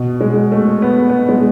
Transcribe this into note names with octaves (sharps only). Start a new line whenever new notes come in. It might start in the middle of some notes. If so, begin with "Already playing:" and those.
Already playing: B2
G#3
A3
B3
B3
G#3